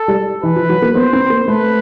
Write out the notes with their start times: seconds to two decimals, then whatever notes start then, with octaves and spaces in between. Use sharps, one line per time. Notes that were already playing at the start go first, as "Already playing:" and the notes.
Already playing: A4
0.08 G3
0.43 E3 B4
0.56 F3
0.69 F#3
0.82 A#3
0.95 B3 C5
1.13 C4
1.30 A#3
1.47 A3 B4